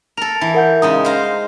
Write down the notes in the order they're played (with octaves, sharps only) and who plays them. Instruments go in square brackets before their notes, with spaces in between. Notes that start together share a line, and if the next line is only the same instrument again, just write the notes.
[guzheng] A4 A#4 [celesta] F7
[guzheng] E3
[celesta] A#4 F#5 G6
[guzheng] C#3 G#3 D#4 [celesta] D#6
[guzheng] C5 F5 A#5